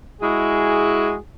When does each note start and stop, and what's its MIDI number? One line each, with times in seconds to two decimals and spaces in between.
0.22 1.14 56
0.22 1.14 64
0.22 1.14 66
0.22 1.14 68